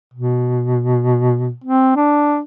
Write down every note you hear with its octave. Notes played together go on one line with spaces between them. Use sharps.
B2
C4
D4